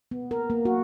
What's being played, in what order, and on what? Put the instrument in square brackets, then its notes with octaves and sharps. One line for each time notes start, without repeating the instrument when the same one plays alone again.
[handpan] B3
A#4
A#3
F#4